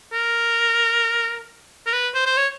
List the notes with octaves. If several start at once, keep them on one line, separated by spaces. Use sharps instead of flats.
A#4
A#4
B4
C5
C5
C#5